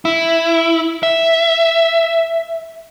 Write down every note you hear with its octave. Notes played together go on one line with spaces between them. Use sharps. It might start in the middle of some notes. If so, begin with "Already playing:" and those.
E4
E5